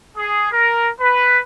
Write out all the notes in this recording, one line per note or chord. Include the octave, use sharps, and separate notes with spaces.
G#4
A#4
B4